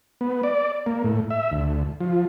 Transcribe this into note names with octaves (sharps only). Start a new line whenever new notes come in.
B3
D5
A#3
A2
E5
D2
F3